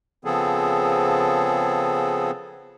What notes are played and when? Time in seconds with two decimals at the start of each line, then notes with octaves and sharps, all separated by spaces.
0.25 C#3 F3 B3 C4 G#4 A4